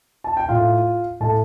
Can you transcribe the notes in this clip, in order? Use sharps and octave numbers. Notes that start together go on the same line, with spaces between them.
A5
G5
A2 A3 F4 F5
A2 A3 A4 A5